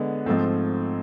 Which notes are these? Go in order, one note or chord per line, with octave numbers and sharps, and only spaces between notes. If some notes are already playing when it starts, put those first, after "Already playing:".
Already playing: D3 G#3 B3
G#2 F3 A3 C4